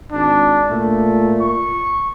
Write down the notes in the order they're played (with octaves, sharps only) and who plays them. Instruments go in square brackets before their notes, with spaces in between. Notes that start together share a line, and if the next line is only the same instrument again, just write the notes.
[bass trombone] G#1 [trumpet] D4
[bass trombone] A#2 [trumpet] A3
[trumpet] C#6